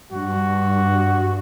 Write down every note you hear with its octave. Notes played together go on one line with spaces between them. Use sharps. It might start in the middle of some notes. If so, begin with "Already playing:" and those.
G2 F#4